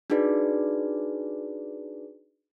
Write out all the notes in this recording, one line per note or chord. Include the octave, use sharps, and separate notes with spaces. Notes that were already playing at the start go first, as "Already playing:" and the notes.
D4 D#4 F#4 G#4 B4 D5